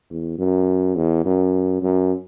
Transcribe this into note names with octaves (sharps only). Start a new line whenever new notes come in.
E2
F#2
E2
F#2
F#2